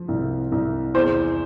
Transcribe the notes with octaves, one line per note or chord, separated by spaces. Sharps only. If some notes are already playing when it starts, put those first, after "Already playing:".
Already playing: F3
C2
C2
E2 C5